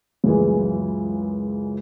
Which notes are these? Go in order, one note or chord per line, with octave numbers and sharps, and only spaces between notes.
C#2 F#2 E3 G#3